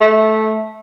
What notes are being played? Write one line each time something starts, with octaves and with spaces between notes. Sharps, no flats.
A3